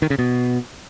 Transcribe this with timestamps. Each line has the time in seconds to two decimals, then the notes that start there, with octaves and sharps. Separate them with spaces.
0.02 D#3
0.10 C#3
0.19 B2